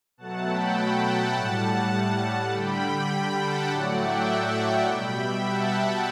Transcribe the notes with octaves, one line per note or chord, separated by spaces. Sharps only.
B2 F#3 A3 F#5 A5
G5 B5
G5 B5
F#5 A5
A2 G3
D3 G3 G5 B5
G5 B5
F#5 A5
A2 F#3 A3 D5 F#5
E5 G5
B2 G3 G5 B5
E5 G5
F#5 A5